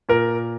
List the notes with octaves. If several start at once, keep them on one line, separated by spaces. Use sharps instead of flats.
A#2 A#4